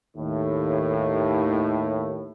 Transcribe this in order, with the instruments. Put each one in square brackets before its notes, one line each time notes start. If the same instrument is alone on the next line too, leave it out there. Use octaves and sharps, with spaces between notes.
[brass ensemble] D#2 A2